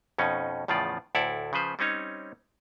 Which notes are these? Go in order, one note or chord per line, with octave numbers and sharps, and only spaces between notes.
F2 B2 C#4 D#4
E2 A2 C#3 F3 F4 D5
D2 A2 E4 A4 D5
C#3 F3 B4 C5
G3 C4 C#4 D#4 C#5